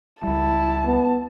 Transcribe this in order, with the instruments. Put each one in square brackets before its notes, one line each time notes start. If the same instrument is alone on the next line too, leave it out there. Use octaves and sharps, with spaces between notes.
[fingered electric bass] C#2 G3 [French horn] E4 [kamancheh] A5
[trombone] B3